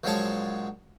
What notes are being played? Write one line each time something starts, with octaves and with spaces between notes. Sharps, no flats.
A#1 F3 F#3 G#3 C#5 A5